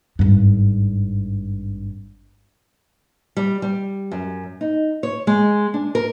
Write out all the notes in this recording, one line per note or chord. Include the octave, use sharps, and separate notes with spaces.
G#1 G2
G3
G3
F#2
D#4
C#5
G#3
D4
A#4